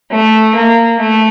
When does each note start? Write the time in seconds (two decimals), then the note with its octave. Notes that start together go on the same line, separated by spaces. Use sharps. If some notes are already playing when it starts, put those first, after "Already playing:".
0.11 A3
0.55 A#3
1.00 A3